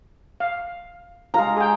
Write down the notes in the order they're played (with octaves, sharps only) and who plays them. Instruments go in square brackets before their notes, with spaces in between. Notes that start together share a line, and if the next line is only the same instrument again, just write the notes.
[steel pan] F5
[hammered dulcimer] G#3 A#5 [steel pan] F4 F5
[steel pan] G#4 G5